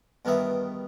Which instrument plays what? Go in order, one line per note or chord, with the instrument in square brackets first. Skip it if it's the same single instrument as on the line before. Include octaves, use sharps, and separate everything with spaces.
[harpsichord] E2 G2 D#3 B3 E5